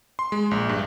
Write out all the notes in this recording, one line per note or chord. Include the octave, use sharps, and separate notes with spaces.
C6
G#3
A#1
G2